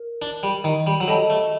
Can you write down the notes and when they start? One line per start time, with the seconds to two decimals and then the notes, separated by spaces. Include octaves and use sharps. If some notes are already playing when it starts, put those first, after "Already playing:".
Already playing: A#4
0.22 D4
0.43 G3
0.64 D#3
0.87 G3
1.00 F#3
1.07 G3 A4 D#5 A5
1.30 A3